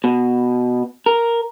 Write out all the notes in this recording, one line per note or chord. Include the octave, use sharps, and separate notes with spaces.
B2
A#4